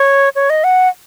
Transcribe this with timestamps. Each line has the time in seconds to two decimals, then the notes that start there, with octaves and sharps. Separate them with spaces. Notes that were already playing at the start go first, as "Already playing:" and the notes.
Already playing: C#5
0.35 C#5
0.50 D#5
0.64 F#5